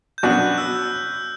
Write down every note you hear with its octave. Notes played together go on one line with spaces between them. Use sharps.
G6
B2 F#3 B3 D4 F#4 F#6
E6